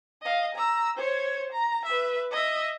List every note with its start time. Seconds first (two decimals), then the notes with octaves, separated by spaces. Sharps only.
0.22 D#5 F5
0.55 A#5 E6
0.97 C5 C#5
1.52 A#5
1.85 B4 E5
2.31 D#5 E5